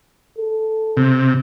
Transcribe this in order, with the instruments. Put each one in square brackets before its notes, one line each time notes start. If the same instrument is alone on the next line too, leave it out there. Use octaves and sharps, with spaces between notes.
[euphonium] A4
[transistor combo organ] C3